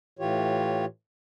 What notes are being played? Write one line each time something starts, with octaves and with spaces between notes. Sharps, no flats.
A2 E3 F4 G4 C#5